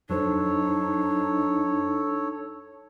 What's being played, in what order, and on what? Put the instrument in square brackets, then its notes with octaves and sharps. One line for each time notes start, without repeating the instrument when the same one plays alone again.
[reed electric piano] F2 F#3 C5 [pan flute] D4 [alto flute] D#4 [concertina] A4 C#5